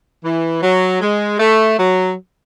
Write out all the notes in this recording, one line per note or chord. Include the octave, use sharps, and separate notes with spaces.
E3
F#3
G#3
A3
F#3